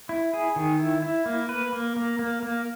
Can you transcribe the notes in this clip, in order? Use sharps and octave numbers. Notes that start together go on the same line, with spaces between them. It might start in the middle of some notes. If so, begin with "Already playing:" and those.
E4
G#4
D#3
E4
E4
A#3
B4
A#3
A#3
A#3
A#3